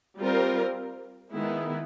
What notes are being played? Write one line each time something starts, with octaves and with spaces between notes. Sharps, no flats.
G3 C4 F4 A#4
D#3 G#3 B3 E4